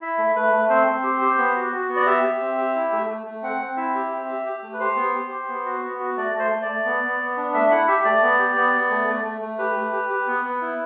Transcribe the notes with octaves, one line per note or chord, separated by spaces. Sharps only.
E4 E5
A3
A3 B4
A3
C4 C5
C4
G4
G4
B3
F#4
F#4
B3
D5
G4 E5
G4
C4
G4
E4
A3
A3
A3
C4 F#5
C4
E4 E5
G4
C4
G4
G4
A3
B4
G4 C5
B3
G4
G4
B3
F#4
B3
F#4
A3 D5
A3 C5
A3
D5
A3
B3
B3
B3
D4
A3 E5
E4 F#5
G4 E5
A3 D5
B3
G4
B3
B3
A3
A3
A3
A3
G4 B4
A3
G4
G4
B3
B3
E4